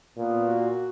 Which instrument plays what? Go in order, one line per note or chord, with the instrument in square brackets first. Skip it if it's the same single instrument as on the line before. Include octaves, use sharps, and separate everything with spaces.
[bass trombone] A#2 [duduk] B3
[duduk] F#4